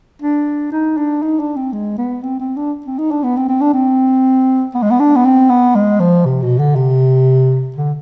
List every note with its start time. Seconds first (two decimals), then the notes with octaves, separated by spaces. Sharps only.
0.22 D4
0.72 D#4
0.97 D4
1.22 D#4
1.39 D4
1.56 C4
1.72 G#3
1.98 B3
2.23 C4
2.40 C4
2.57 D4
2.86 C4
2.98 D#4
3.11 D4
3.23 B3
3.37 C4
3.48 C4
3.61 D4
3.73 C4
4.74 B3
4.82 G#3
4.91 B3
5.00 D4
5.16 B3
5.25 C4
5.49 B3
5.75 G#3
6.00 F3
6.25 C3
6.42 B2
6.59 D3
6.75 C3
7.76 D3